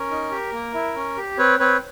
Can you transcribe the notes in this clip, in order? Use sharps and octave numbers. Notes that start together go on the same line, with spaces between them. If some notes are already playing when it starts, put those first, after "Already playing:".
Already playing: C#4 A#4
D#4
G4
A#3
E4
C#4
G4
C4 B4 C#5
C4 B4 C#5